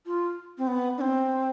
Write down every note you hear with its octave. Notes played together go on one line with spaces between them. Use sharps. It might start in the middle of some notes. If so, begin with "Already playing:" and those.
F4
C4
B3
D4
C4